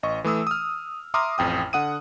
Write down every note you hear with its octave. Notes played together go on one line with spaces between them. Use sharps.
A1 D#5 C#6
E3 A3 D#6 E6
D#6 F6
E5 A#5 C6 D6 D#6 F6
A1 F2 G5 D#6
D3 F#5 D#6 D#7